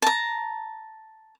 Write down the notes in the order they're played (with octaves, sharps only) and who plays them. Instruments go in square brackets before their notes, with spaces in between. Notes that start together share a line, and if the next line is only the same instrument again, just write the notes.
[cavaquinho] A5 A#5